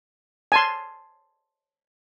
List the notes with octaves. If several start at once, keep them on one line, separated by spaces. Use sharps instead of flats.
G#5 A5 C6